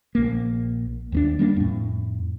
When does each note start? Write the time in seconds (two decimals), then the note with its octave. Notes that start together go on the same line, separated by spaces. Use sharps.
0.15 A#1 A#3
1.12 D#2 A#3 D4
1.39 G3 A#3 C#4 D4
1.56 F2 A2